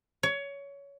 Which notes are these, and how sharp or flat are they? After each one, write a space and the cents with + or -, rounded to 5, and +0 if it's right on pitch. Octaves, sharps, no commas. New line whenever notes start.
C#5 +20